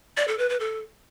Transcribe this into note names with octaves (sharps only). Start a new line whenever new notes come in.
D5
A4
B4
B4
A4